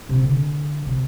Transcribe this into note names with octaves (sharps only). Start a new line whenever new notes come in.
C3
D3
C3